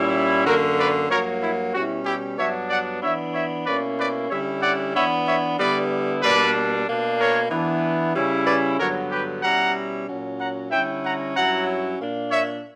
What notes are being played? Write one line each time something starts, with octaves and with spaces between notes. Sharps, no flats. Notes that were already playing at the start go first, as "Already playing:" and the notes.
Already playing: A#2 G3 C#4 E4
F#2 D3 A#3 C#4 F#4 A#4
B4 D5
G2 F#3 A#3 A#4 C#5
E4
B2 G3 C#4 E4 F#4
E4 G4
G2 F#3 B3 D4 C#5 E5
D5 F#5
E3 B3 D4 C#5 E5
C#5 E5
B2 A#3 C#4 E4 B4 D5
B4 D5
D3 G3 C#4 E4 C#5 E5
D5 F#5
E3 B3 D4 C#5 E5
C#5 E5
D3 G3 B3 E4 B4 D5
B2 G3 A#3 D4 B4 D5
B2 A#3 D4
A#4 C#5
E3 B3 D4
C#3 G3 C#4 E4
B4 D5
G2 D3 F#3 B3 A#4 C#5
G4 B4
B2 G3 C#4 E4 F#5 A#5
A#2 F#3 C#4
F#5 A#5
D3 G3 C#4 E4 E5 G5
F#5 A#5
G2 F#3 C#4 E4 F#5 A#5
A#2 A#3 D4
C#5 E5